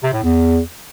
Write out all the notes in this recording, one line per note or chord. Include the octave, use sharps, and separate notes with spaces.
C3
A2
E2